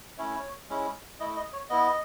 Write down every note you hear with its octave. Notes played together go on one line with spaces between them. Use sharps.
A3 C#4 E4 C#5
G#3 C#4 E4
A3 E4 D#5
D#5
C#5
B3 E4 D#5